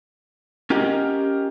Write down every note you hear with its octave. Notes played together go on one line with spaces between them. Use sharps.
C#4 F4 G4 A#4 D#5 F#5